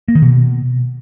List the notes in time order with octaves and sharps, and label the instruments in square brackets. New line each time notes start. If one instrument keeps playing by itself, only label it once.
[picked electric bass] A#3
D#3
B2